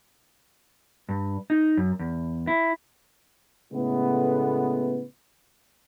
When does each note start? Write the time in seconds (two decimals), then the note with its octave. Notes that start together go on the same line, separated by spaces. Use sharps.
1.09 G2
1.50 D#4
1.77 F#2
1.99 E2
2.47 E4
3.72 A2 C#3 G#3 A3 B3